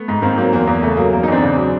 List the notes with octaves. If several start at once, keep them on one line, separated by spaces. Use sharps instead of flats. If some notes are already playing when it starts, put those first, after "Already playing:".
Already playing: A3 B3
G#2
D#3 A#3 C4
F#3 A#3 C4
E2 A#3
E2 A#3
C#3 A3
F#3 A#3
E2 A#3
D#4
E2 C4 D4
C#3
F#3